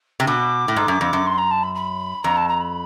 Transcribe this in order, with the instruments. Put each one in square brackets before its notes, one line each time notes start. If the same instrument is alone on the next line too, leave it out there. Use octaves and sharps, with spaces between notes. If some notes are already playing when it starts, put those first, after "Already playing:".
[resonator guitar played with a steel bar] C3
[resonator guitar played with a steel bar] B2 [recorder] D6
[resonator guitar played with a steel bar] A2
G#2
F#2
F2
F#2
[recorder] C6
A#5
A5
B5
B5
[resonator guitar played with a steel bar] F2 [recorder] A#5
[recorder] A5
A#5
B5